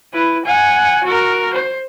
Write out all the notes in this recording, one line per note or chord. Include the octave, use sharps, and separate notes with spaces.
E4 B4
F#5 G#5
F#4 A#4
C5